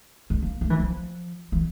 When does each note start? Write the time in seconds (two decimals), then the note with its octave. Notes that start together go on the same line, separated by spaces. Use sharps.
0.30 G#3
0.42 A#3
0.61 A3
0.70 E3
0.79 F3
1.52 E3